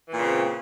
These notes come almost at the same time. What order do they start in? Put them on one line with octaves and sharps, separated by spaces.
E3 A#2 C#3 C4